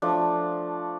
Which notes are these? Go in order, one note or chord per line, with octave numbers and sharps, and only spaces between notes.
F3 A3 D4